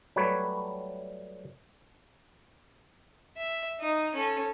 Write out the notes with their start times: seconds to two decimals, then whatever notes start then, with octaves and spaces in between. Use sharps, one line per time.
0.16 F#3 G3 A3 B4 C#5
3.37 E5
3.80 D#4 D#6
4.15 C#4 A4